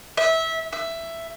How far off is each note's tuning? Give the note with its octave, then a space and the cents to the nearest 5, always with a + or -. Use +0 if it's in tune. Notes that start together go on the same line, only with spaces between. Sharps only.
E5 -20
E5 +10